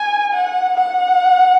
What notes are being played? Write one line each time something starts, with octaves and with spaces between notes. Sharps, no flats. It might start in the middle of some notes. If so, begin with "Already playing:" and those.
Already playing: G#5
F#5
F#5